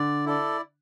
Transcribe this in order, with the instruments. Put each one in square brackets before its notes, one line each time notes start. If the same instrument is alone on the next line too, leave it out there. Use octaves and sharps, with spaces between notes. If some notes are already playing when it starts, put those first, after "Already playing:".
Already playing: [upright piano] D3 [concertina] D5
[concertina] E4 A4 D5